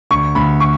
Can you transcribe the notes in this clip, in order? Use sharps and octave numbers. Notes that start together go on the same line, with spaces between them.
D2 C#6
D2 B5
C#6